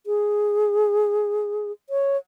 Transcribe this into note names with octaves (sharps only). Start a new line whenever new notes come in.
G#4
C#5